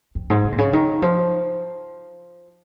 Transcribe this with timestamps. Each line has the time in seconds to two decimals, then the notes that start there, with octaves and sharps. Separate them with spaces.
0.15 F2
0.30 G#2
0.44 C#3
0.52 A#2
0.58 C#3
0.73 D#3
1.02 F3